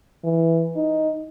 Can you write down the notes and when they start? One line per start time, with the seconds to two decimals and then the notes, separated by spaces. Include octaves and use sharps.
0.24 E3
0.76 D#4